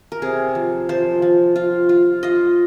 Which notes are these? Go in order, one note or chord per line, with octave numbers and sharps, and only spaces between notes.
A#4
C3 G#4
F3
F3 C5
F3
F4
F4
F4 D#5